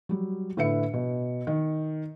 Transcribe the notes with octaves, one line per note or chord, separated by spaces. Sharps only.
F#3 G3
A2 D3 B4 E5 C#7
B2
D#3